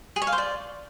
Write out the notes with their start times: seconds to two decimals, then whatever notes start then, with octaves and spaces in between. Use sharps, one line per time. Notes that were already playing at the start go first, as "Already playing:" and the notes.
0.16 G#4
0.22 C#5
0.27 F5
0.32 C5
0.38 D5